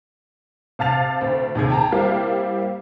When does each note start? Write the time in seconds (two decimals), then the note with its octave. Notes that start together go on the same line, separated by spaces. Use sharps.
0.79 C3 F5 A5 A6 F7
1.21 D2 C4
1.55 D#2 C3 G#4 G#6
1.70 G5 A5 A#5
1.92 G3 A#3 C4 E4 G4 F5